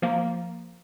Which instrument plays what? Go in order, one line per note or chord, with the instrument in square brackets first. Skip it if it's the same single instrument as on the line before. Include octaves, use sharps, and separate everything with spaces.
[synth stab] F3 A#3